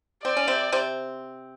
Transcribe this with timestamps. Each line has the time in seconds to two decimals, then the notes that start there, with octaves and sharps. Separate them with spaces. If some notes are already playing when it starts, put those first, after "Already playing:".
0.25 C4 D5
0.37 C#4
0.47 C3 C4
0.72 C3 C4